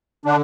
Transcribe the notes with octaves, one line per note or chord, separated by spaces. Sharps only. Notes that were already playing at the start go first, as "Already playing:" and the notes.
D3 D4